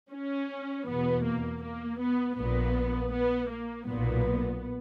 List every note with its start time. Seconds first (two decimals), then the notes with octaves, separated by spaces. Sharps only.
0.11 C#4
0.87 E2 B2 B3
1.24 A#3
1.62 A#3
1.99 B3
2.36 A#1 A#2 B3
3.12 B3
3.49 A#3
3.87 B1 A#2 B3